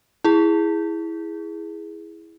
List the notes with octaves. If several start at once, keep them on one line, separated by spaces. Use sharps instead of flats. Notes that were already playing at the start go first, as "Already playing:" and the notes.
E4 G#4